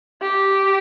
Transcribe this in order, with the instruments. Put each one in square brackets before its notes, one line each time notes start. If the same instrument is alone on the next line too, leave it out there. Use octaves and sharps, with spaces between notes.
[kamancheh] G4